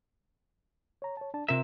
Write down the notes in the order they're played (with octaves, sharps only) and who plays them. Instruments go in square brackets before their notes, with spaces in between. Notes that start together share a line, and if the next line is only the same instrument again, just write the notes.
[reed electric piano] C#5 A#5
C#5 A5
D4 D5 A5
[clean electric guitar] C3 E5 [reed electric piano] F4 A#4 A#5